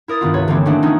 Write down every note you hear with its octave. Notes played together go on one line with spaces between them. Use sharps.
E4 A#4 D#6 A6
G2 D#3 B3 F4
C2 B4 C#5
D3 E3 G3 A#3 C4 C#4
D#3 E3 A3 B3 C4 D4
F3 B3 C#4 D#4